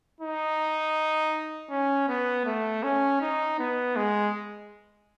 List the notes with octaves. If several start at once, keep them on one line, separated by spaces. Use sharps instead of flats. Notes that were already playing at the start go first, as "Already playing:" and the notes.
D#4
C#4
B3
A3
C#4
D#4
B3
G#3